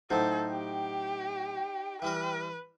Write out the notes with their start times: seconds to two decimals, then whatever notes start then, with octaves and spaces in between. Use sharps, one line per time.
0.10 A2 F#3 D#4 A4 C5
0.51 G4 G5
2.02 E3 G3 A#4 B4